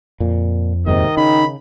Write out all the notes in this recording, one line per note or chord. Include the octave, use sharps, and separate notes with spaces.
F2 A#2
D#2 G#2 C3 D#3 D#5
C#3 D#4 B5